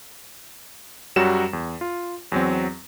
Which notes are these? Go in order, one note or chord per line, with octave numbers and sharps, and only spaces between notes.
F#2 F#3 G3 F#4 E7
E2
F4
E2 F#3 C4